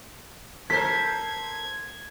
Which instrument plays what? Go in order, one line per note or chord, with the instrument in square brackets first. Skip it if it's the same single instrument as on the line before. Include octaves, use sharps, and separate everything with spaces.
[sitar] A4 A#4 C5 [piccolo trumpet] G#6 [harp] B6